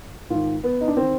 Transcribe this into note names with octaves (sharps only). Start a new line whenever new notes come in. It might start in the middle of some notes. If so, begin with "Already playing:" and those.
G#2 D#3 F4
B3
D#4
D4
D#3 C4